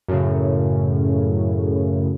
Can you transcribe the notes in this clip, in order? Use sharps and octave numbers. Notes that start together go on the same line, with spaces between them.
F#2 A2 C#3